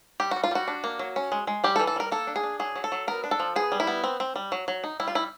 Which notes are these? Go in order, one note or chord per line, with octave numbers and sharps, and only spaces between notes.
G3 G4
G3 F#4
F4
G3 F#4
D4
A#3
F#3
C#4
G#3
G#3
G3 G4
A4
E3
A4
G3 A#4
A#3 A4
D4
G#4
D4
F#3 G#4
F#3
A4
F#3
B3 A#4
D4
A4
F3
B3 G#4
G3
E4
B3
C4
C4
G3
F#3
F#3
D#4
G3 E4
F4
G3 E4